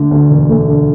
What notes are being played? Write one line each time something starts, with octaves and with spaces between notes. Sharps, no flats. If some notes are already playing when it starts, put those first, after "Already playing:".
Already playing: D3 A3
D2
E1
A3
D3